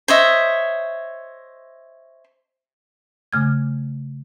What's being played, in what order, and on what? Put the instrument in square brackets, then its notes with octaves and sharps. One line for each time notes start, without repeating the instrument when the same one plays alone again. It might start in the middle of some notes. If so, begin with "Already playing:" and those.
[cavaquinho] C5 C#5 D#5 E5
[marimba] C#3 A3 F6 G#6